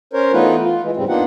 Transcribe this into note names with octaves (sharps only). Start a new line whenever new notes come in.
C#4 A#4 C5 C#5
E3 A3 B3 D#4 F4 B4
F4
E3 G#3
E2 G#2 C#3 G3 C4
A#3 B3 D4 D#4 F4 F#5